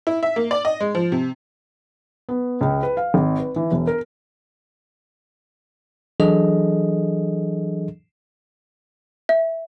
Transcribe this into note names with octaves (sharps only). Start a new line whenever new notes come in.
E4
E5
A#3
D5
D#5
G#3
F3
C3
B3
C#2
B4
F5
G#1
B4
E3
E1
A#4
E3 F#3 D4 G#4 A4 D#5
E5